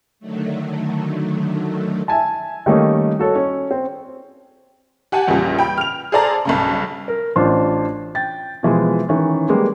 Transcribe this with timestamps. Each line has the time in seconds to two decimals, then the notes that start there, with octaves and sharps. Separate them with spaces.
0.20 D3 D#3 F#3 A3
2.08 E5 G#5 A5
2.66 D#3 G3 A3 A#3 C#4 D#4
3.19 F#4 A4 C#5
3.35 C#4
3.71 C4
5.12 G4 F#5 G#5 A5
5.28 A#1 E2 A#2 C#3 G3
5.58 G5 B5
5.78 F6 F7
6.12 G#4 A4 C5 D5 A5 A#5
6.45 B1 G2 C#3
7.08 A#4
7.36 A1 D4 F4 C5
8.15 G5 A6
8.63 B2 E3 F3 G#3
9.09 D#3 E3 C#4
9.47 G3 G#3 A#3 B3